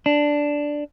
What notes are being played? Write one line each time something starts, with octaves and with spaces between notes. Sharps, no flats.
D4